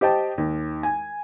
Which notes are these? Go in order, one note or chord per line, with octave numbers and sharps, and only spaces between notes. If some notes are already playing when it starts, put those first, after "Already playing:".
G4 C5 D#5 G5 A5
D#2
G#5